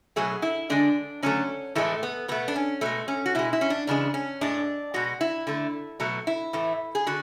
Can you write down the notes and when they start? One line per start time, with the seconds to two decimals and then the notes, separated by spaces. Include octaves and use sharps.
0.16 B2 F#3 A3 G#4
0.42 E4
0.70 D3 G#3 D4
1.23 D3 F#3 A3 C#4
1.75 A2 E3 G#3 A3
2.03 B3
2.28 B2 A3 B3
2.48 D4
2.56 C#4
2.81 B2 G#3 A3
3.08 C#4
3.26 F#4
3.35 B2 G#3 E4
3.53 E4
3.61 C#4
3.70 D4
3.87 C#3 E3 G#3 D4
4.14 C#4
4.41 A2 G#3 D4
4.94 B2 G#3 F#4
5.21 E4
5.47 D3 A3
6.00 B2 F#3 A3
6.27 E4
6.53 A2 E3 A3
6.95 G#4
7.06 D3 F#4